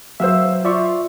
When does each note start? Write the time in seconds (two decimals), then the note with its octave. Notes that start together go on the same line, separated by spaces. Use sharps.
0.20 F#3 C5 E5 F5 E6
0.65 F4 D5 E5 C#6